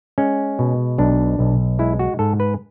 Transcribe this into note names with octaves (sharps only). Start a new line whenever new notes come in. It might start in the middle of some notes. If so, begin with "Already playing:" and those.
G#3 C#4
B2
B1 D4
B1
G#3 E4
F#4
G#2 A4
B4